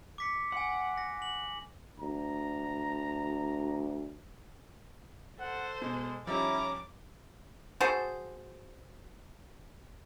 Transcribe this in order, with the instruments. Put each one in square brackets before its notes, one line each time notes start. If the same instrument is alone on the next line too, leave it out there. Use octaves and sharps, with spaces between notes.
[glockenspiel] D6 B6 C#7
[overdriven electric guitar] F#5 [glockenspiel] G#5 C6
[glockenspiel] A#6
F#7
[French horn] D2 [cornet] A#5
[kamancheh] A4 [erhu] C5 [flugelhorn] F#5
[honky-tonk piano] B2 [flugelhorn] G#3
[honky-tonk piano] F3 G3 D#4 [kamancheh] C#4 A#5 [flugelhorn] E4 [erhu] D6
[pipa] F#4 G#4 A4 C5